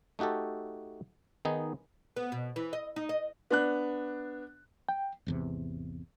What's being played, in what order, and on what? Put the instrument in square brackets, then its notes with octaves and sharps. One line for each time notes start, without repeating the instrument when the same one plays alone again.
[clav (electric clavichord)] A3 D#4 F#4 G4 A4
D#3 B3 D#4 G#4
[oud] B3
B2
E3
D#5
D#4
D#5
[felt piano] B3 D4 F#6
[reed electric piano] G5
[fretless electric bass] G#1 E2 C3